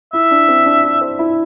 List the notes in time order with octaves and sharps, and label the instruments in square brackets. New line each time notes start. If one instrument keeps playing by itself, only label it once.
[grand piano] E4 [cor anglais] E5
[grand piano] D4
C4
D4
E4
C5
E4